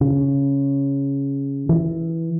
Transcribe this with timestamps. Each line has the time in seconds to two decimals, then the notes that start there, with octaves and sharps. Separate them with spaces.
0.01 C#3
1.69 E3